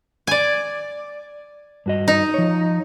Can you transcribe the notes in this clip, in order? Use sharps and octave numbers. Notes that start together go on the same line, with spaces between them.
D5 G#5
G2 F#4 D#5
D#4
F3 C#5